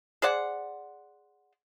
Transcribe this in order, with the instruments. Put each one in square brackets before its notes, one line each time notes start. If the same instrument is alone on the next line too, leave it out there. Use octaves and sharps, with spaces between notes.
[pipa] G#4 C5 D5 F#5